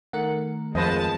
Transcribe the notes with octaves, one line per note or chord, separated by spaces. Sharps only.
D#3 A3 A#4 F#5
F2 G#3 B4 C5 D#5 A5